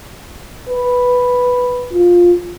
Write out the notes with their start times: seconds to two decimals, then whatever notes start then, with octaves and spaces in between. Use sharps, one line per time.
0.69 B4
1.93 F4